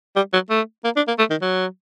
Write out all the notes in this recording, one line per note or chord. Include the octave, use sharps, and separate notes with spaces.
G3
F#3
A3
A#3
D4
A#3
A3
D#3
F#3